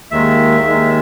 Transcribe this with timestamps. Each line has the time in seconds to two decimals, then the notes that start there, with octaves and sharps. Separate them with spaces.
0.11 D#2 D#3 G#3 E5
0.67 D#2 D#3 G#3